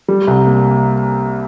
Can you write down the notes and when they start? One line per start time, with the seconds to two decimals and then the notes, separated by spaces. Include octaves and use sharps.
0.08 G3
0.27 C2
0.47 A#3